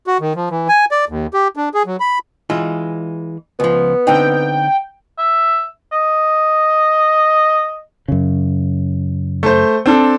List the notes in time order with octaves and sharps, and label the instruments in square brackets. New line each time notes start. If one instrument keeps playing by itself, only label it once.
[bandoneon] F#4
D#3
F3
E3
G#5
D5
D#2
G4
D4
G#4
F#3
B5
[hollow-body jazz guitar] E3 G#3 F4
[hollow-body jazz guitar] C#2 F3 [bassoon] B3
[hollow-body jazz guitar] D3 C4 D#4 [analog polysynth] G5
[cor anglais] E5
D#5
[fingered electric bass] F#2 C#3
[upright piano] A3 C5
C4 D4 A4